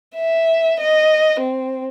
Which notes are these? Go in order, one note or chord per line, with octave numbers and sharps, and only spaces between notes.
E5
D#5
C4